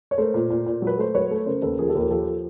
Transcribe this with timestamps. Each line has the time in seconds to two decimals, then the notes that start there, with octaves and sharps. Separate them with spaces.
0.11 C#5
0.18 A3 A#4 C5
0.34 A#2
0.50 A#2
0.66 A#2
0.82 F#3
0.87 B4
0.98 A3 C5
1.14 F#3 B4 C#5
1.31 A3
1.46 C#3 A#4 C5
1.62 D#2 A4 B4
1.78 F3 G#4 A#4
1.89 G4 A4
1.95 D#2 A#4
2.00 G4 A4
2.11 F3 G4 A4